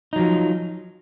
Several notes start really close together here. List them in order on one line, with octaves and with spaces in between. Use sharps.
D#4 F#3 F3